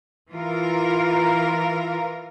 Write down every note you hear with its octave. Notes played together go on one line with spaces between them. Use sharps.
E3 F4 A#4